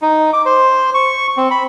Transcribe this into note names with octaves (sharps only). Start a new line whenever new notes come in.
D#4
D6
C5
C#6
C4
B5